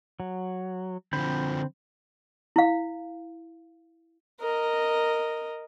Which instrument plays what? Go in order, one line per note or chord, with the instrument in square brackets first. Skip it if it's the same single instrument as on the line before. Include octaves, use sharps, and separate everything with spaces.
[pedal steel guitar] F#3
[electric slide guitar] D3 F3 [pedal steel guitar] C4 B5 G6
[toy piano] E4 F5
[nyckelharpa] A#4 D#5